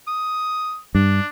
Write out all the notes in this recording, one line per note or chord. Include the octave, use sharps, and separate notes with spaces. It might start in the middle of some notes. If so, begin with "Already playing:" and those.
D#6
G2 D4